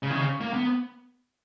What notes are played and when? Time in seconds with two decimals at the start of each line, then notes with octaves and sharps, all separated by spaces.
0.03 C#3
0.10 D#3
0.15 C#3
0.41 A#3
0.54 B3